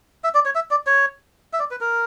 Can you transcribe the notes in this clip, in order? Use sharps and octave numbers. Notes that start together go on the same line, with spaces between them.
E5
D5
C#5
E5
D5
C#5
E5
D5
B4
A#4